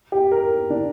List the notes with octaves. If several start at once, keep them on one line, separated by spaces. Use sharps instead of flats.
G4
A#4
D4